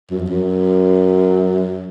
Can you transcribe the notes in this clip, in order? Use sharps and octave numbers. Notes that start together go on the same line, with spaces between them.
F#2
F2
F#2